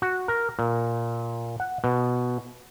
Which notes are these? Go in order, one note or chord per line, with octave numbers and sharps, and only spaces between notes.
F#4
A#4
A#2
F#5
B2